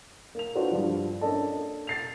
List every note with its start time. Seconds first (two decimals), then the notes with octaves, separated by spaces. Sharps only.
0.35 A#3 F7
0.55 D4 F4 F#4 A4 B4 C5
0.71 G2 F3 G3
1.21 A#3 C#4 D4 A4 D#5 A5
1.87 A6 C7 F7